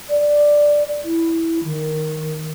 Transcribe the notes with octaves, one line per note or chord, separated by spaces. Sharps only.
D5
E4
D#3